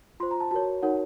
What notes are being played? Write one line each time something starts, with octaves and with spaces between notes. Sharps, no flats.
F4 C5 C6
A#5
A5
F#4 A#4 C#5 A5
D#4 F#4 A#4 C#5 F#5